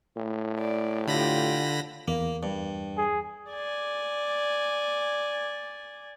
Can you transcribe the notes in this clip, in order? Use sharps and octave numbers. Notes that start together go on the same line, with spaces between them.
A2
D5
D3 F4 G4 B5 A#6
E2 A#3
G2
G#4
D5 G#5